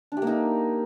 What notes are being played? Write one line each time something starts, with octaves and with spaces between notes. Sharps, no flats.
D4
G4
A#3
D#4